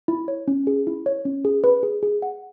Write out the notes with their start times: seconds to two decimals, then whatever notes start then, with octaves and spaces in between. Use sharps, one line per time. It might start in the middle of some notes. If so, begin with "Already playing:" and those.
0.08 E4
0.28 C#5
0.48 C#4
0.67 G#4
0.87 E4
1.06 C#5
1.25 C#4
1.45 G#4
1.64 B4
1.83 G#4
2.03 G#4
2.22 F#5